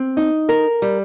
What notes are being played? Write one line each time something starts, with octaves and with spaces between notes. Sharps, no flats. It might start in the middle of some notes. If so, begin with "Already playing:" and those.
Already playing: C4
D#4
A#4
G3